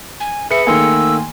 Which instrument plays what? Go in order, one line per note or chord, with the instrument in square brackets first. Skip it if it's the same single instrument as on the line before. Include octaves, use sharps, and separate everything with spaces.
[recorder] G#5
[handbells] G#4 C#7 [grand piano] B4 [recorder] E5
[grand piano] D#3 A3 A#3 [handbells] G#5 C6 [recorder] E6